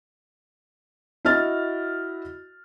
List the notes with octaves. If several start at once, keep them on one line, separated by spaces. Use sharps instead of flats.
E4 F#4 D#5 F6 A6